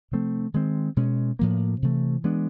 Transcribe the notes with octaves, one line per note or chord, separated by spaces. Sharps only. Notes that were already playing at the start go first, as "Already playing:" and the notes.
C3 F3 A3 C4
D#3 G#3 C4
B2 G#3 C#4
A2 F3 A#3
C3 E3 A3
E3 G#3 B3 D4